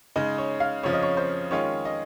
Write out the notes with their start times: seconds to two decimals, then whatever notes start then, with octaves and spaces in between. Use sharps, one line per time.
0.16 C#3 G#3 D#4
0.38 C#5
0.60 F5
0.83 F2 C#3 F3 C#5
0.93 D#5
1.03 C#5
1.17 C5
1.51 D#3 G#3 C#4 F4 C#5
1.85 D#5